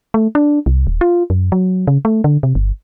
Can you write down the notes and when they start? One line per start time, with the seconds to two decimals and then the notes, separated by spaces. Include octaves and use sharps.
0.14 A3
0.35 D4
0.66 C2
0.87 D#1
1.01 F4
1.30 F#2
1.52 F#3
1.87 C#3
2.05 A3
2.24 D3
2.43 C3
2.55 G1